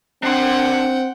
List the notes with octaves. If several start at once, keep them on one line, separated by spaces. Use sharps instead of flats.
C4 D4 F#5 G5 C6